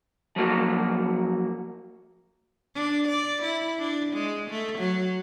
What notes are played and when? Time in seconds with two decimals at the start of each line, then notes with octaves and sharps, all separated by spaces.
0.36 F3 F#3 A#3 F#4
2.75 D4
3.08 D5
3.43 E4
3.78 D4
4.13 G#3
4.50 A3
4.78 F#3